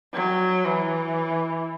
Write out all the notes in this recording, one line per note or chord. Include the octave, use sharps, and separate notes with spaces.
F#3
E3